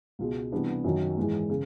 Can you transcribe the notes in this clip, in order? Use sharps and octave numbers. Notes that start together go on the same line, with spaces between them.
C#2 B2 G#3
C3 E3 G3 B3 D4
F#2 D#3 F#3
G#2 E3 G#3
C#3